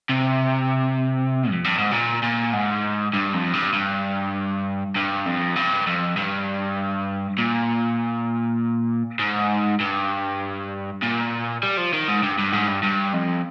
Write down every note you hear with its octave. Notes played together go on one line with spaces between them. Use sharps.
C3
F2
G2
G#2
A#2
A#2
G#2
G2
F2
G2
G2
G2
F2
G2
F2
G2
A#2
G#2
G2
A#2
G3
F3
D#3
G#2
G2
G2
G#2
G2
G2
F2